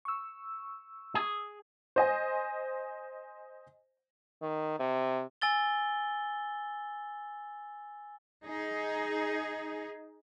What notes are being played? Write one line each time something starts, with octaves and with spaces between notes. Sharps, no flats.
C#6 E6
G#4
C5 D#5 G#5
D#3
C3
G#5 E6 A6 G7
D#4 G#4